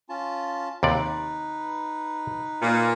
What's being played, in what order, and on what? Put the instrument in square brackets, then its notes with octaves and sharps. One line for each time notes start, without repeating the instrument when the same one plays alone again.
[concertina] C#4 F4 A5
[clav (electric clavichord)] D#2 C3 D5 [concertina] D#4 B4
[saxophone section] A#2